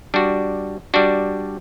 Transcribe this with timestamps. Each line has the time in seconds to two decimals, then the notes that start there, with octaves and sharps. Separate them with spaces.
0.14 G3 D4 F#4
0.94 G3 D4 F#4